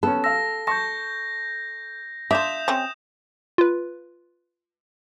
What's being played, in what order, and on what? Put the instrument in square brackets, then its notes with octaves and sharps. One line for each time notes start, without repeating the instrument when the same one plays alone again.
[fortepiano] B3 C#4 [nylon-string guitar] A4
[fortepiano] F5 E6 [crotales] A#6
[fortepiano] A5 C#6 [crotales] G6 A#6
[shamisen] D4 F4 [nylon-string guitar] E5 [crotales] D#6 G6 E7
[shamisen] C4 C#4 G#4
[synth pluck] F4 B4